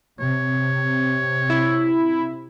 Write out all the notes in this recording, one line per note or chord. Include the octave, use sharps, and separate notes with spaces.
C3 C#5
E4